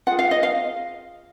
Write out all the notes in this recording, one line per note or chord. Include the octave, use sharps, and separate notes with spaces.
F4 G#4 F#5
F5
D#5
F5